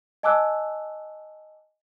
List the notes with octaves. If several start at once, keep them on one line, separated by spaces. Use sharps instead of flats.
D#5 G#5 A5 D6 E6 F#6